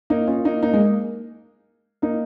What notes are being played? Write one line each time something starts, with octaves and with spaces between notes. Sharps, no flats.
A#3 D#4
C#4 F4
A#3 D#4
A#3 D#4
G#3
A#3
A#3 D#4